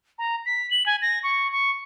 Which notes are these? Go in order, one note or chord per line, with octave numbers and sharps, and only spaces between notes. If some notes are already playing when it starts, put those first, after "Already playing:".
A#5
B6
F#7
G#5
A#6
C#6
C#6